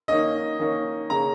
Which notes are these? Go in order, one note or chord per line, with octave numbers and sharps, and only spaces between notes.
D#3 A#3 C#4 D#5
D#3 A#3 C#4
C#3 A#3 C#4 A#5